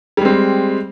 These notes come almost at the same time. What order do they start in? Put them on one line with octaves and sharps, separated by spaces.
G3 G#3 C4